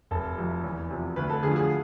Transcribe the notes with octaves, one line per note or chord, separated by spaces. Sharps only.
F1 A4
F2 C3 F3
E2
C3 F3
D2 B4
A4
D3 F3 G#4
F4
G#4